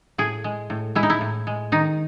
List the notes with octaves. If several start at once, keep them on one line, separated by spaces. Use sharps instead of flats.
A2 G#4
G#3
A2
G#3 E4
D#4
E4
A2
G#3
D#3 D#4